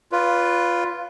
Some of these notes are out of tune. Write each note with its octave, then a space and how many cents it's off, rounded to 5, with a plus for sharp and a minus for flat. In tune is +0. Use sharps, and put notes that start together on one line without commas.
F4 +0 B4 +0 D5 -45